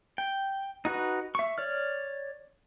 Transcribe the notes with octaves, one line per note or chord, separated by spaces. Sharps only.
G5
D#4 F#4 B4
E5 C#6
C#5 D5 F6